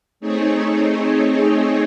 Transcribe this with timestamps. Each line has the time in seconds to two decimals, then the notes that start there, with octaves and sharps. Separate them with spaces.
0.20 A3 C4 D#4 G#4 C#5